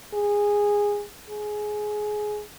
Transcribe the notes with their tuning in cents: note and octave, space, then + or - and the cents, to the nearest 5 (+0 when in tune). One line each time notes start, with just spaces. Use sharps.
G#4 -15
G#4 +15